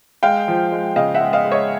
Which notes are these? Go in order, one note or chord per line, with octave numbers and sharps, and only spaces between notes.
G#3 F5 G5
F3
G#3
C#3 D#5 F5
E5 F#5
G#3
D#5 F5
G#3
C#5 D#5